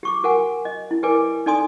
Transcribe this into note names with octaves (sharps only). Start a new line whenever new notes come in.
G4 C#6 D6
F#4 A#4 F#5 G#5
D#5
E4
G4 A#4 B4 D5 G#5 D6
D#4 A4 D5 G#5 C6 D#6